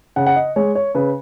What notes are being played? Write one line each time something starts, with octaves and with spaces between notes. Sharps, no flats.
C#3 F#5
F#5
D#5
G#3 C#5
C#5
C#3 B4